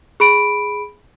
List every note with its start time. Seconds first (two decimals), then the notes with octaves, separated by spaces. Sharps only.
0.20 G#4 B5 D7